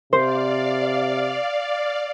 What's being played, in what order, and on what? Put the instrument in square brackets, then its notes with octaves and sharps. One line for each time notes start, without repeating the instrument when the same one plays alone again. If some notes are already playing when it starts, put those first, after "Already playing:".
[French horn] C3 [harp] C5 [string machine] D5 F5